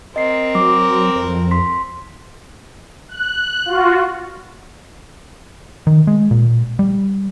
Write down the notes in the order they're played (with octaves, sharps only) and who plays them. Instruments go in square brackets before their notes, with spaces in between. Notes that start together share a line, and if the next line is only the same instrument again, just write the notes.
[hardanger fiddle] C4 A#4 [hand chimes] D#5 C7
[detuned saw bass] F#3 [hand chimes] D6
[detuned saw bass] F2 [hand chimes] C5
[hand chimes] C6 B6
[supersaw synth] F#6
F4 F#4
[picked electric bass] D#3
G#3
A#2
G3